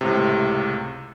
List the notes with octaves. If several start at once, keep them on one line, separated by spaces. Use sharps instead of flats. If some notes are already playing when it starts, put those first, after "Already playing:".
C#2 A2 C3